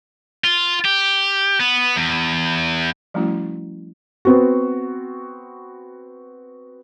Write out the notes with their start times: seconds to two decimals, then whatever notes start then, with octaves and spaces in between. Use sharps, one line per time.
0.44 F4
0.85 G4
1.60 B3
1.96 E2
3.14 F3 G3 A3 C#4 E4 F#4
4.25 B3 C4 F#4